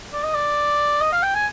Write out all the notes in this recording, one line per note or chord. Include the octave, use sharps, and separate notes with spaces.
D5
D#5
D5
D#5
F5
G5
G#5